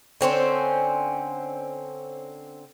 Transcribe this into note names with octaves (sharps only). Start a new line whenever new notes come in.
D3 C4 C#4 C5